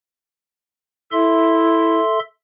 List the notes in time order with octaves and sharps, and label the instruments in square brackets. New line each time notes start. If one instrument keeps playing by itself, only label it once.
[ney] E4 [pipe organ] A4 E5 C6